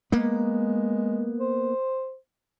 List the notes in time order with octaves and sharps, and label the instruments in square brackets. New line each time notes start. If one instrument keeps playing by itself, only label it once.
[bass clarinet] G#3 [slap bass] A#3 B3
[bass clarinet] C5